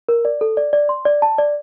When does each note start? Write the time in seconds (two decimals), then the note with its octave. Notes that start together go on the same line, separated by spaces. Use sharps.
0.09 A#4
0.25 D5
0.41 A4
0.57 D5
0.73 D5
0.89 C6
1.05 D5
1.22 A5
1.38 D5